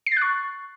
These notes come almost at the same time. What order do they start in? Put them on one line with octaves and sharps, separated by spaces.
C7 A6 F#6 C#6